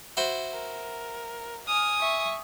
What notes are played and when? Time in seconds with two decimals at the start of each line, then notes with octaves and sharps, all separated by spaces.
0.17 E4 F#4 C5
0.53 A#4
1.68 G#5 D#6 F6
1.99 E5 C#6